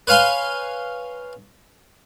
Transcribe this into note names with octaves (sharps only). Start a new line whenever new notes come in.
B4 C#5 F5 G#5 C6